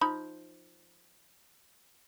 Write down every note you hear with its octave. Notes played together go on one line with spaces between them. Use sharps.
F3 D#4 B5